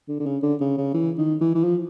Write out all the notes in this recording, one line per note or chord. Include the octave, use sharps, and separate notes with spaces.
D3
D3
C#3
D3
C#3
C#3
E3
D#3
E3
E3
F3